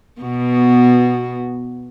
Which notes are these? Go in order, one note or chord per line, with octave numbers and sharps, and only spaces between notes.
B2 B3 F#4